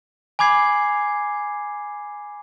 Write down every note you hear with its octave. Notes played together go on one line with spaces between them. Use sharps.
G#5 B5 D6 G#6 C7 F#7